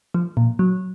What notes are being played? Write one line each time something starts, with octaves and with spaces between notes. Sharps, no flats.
F3
A#2
F#3